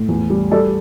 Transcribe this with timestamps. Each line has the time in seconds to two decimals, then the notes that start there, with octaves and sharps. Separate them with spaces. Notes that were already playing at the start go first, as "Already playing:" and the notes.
Already playing: A2
0.08 E2
0.30 G3
0.51 G3 A4 D5